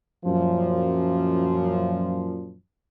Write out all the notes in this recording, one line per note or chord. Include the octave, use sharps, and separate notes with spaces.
F#2 A#2 F3